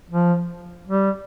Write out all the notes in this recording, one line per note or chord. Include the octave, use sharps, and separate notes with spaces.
F3
G3